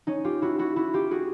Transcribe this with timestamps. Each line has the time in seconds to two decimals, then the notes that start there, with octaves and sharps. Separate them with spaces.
0.07 C#4 D#4
0.24 F4 G4
0.42 E4 F#4
0.59 E4 F#4
0.76 E4 F#4
0.93 F4 G4
1.11 F#4 G#4